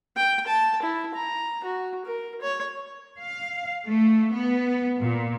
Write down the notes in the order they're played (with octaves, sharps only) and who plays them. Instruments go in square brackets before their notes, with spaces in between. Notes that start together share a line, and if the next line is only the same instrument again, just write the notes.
[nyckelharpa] G5
A5
E4
A#5
F#4
A#4
C#5
[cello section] F5
A3
B3
A#2